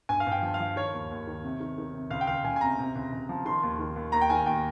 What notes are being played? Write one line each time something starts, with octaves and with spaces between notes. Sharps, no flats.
G2 G#5
F5
G2 G5
F3
F5
F3
D#3 C#5
D#2
D#2
D#3
C3
D#3
D#3
C3
C#2 F5
G5
C#2 F5
C#2 G#5
G#5
C3 A#5
C3
C#2
C#2
F3
D#3 C6
D#2
D#3
D#2
D#2 A#5
G5
D#3 G#5
D#2 G5